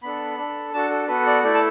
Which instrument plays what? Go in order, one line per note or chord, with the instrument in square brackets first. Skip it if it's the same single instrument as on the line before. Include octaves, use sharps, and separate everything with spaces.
[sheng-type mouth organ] B3 D4 A4 B5
D4 A4
D4 F#4 A4 A5
A4
B3 F#4 A4 B4
D5
A3 E4 A4 D5
A5